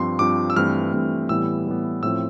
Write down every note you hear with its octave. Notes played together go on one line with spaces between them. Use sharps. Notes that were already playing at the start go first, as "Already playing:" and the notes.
Already playing: G2 F3 C4 C6
G2 F3 C4 D6
E6
G2 E3 A3 C4 F6
G2 E3 A3 C4
A2 E3 G3 B3 E6
A2 E3 G3 B3
A2 F3 C4 E6